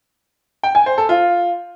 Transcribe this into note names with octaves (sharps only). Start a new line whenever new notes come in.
G5
G#5
C5
A4
F4